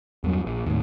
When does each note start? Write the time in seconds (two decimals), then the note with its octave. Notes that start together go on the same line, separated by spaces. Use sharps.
0.24 E2 G2 F#3
0.46 A#1
0.66 D#2 A2